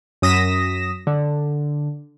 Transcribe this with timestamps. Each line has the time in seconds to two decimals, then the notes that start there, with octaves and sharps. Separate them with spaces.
0.22 F#2 D#6 A#6 B6 E7
1.07 D3